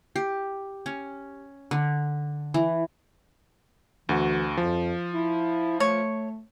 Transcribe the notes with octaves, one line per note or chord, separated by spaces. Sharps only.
G4
C#4
D3
E3
D2 E3 F#4
F2 F3
E4
A3 C#5